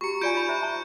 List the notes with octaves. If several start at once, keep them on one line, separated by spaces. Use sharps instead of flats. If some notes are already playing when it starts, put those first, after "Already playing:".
F#4 G4 A#5 C#6 C#7
F4 D5 G#5 G6 D7
D#4 F4 B5
C5 E5 A#5
A5 C#6